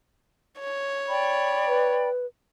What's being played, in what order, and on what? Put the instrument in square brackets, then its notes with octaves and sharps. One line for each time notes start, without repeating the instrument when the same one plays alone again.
[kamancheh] C#5
[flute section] D5 G5 B5
[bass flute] B4